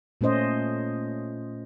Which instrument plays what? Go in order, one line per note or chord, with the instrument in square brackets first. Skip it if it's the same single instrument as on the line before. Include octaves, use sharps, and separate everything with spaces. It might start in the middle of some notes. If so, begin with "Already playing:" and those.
[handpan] A#2 A3 C#4 C5 D#5